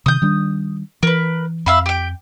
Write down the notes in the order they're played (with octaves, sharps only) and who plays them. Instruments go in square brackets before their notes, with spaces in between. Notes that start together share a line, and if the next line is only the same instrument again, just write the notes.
[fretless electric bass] C3 D#3 [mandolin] D#6 G6
[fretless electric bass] D#3 G3 D4
[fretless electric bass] E3 [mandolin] A#4 B4
[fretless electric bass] F2 [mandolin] E5 F5 B5
[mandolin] G4 G5